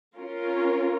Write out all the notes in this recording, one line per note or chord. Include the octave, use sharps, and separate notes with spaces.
C#4 F4 A#4